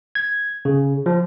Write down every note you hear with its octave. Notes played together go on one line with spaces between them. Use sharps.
G#6
C#3
F3